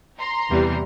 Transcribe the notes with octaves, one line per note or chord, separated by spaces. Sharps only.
A#5 C6
E2 C3 E3 G3